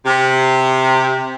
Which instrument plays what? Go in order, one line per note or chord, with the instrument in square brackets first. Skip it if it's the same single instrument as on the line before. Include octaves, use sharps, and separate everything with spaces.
[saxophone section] C3